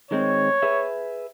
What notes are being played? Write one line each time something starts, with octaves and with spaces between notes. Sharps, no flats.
D#3 G#3 C4 C#5
G#4 B4 E5